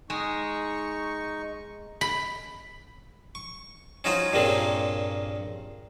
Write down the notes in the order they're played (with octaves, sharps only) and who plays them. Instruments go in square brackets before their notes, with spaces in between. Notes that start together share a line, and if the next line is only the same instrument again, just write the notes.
[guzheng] G#3 [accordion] D#4 C#6
[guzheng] B5
[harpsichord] C#6
C#4 D#4 F4 F#4 C5 C#5
G2 A#2 C#3 A#3 C4